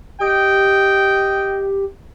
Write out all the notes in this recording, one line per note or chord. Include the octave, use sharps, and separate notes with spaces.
G4 D#5 G5